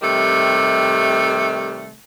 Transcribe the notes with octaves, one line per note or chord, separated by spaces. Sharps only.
C3 D#3 G3 A3